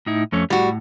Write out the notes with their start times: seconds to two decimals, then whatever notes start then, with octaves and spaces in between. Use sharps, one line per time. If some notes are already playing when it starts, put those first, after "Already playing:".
0.06 A2 D#4 E4
0.32 F2 A3 C#4
0.50 A2 G3 F#4